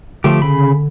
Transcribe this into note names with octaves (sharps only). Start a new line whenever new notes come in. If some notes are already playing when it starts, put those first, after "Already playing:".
D3 F3 A3 G4
C#3 B5